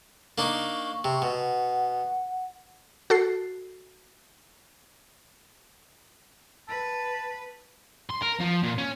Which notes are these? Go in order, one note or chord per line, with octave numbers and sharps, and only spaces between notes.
A#3 D4 D#4 C#6
C3
B2 F#5
F#4 A4 C7
B4 A5
C6
A#4
F3
A#2
C#4